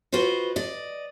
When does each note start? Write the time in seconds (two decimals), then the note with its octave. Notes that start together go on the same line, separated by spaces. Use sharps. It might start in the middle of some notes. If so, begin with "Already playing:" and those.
0.12 F4 F#4 B4 C5 D#5
0.56 D5 D#5